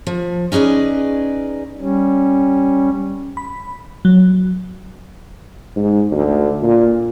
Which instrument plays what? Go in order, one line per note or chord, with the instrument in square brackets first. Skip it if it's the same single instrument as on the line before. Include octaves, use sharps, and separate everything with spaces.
[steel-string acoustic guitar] F3
C#4 D#4 G#4 B4 D5
[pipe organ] G3 C#4
[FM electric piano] B5
F#3
[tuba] G#2
D2
A#2